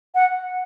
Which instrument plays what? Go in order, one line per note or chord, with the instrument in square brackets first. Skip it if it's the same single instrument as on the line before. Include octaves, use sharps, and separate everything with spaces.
[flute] F#5